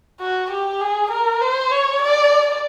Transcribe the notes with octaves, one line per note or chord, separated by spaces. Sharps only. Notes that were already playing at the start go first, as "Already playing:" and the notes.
F#4
G4
G#4
A#4
C5
C#5
D5